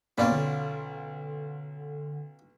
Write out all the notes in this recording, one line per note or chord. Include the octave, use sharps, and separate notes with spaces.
B1 A#3 C#4 F4 D5 B5
D3